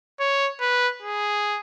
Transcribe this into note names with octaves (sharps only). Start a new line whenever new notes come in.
C#5
B4
G#4